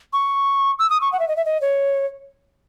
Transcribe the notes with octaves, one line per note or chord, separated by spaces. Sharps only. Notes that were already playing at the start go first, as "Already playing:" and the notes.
C#6
E6
D#6
C#6
F#5
E5
D#5
E5
D#5
C#5